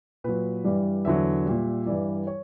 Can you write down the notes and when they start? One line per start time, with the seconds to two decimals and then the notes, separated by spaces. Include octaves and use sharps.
0.24 A#2 F#3 B4
0.64 G2 E3 G3 D5
1.05 E2 D3 F#3 E5
1.46 A#2 G3
1.86 G2 E3 G3 D5
2.27 C#5